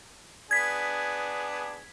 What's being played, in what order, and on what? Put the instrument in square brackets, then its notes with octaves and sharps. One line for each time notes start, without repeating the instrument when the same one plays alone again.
[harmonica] B3 D4 G#4 [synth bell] G#6 B6